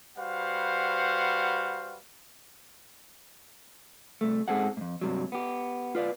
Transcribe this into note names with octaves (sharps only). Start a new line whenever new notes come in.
G3 F#4 B4 C5 F5 F#5
C2 A3
G#2 C4 G#4 A4 F#5
F2 G#2
G2 C3 F#3
B3 G4
F4 B4 D5 F5